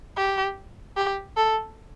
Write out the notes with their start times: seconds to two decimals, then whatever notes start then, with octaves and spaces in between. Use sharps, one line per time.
0.17 G4
0.97 G4
1.37 A4